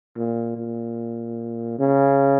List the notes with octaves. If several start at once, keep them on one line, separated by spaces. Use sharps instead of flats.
A#2
A#2
C#3